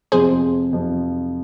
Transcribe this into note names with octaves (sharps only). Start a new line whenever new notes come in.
F2 C3 F3 G#4 C5
F2 C3 F3